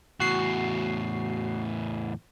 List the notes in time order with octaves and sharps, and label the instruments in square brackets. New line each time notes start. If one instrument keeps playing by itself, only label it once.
[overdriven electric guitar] E2 A2 [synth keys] F#4 C7